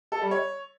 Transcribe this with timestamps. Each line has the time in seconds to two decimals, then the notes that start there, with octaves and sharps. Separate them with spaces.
0.12 A4
0.21 G3
0.31 C#5